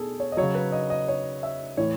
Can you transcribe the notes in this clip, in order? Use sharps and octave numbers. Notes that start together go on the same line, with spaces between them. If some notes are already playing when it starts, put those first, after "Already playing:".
Already playing: B2 G#4 A4
C#5
D#5
C#3 F#3 C#5
B4
D#5
D#5
C#5
E5
A2 E3 C#5